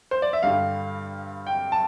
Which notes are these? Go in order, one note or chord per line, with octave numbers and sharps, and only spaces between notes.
C5
D5
E5
G2 D3 G3 F5
G5
A5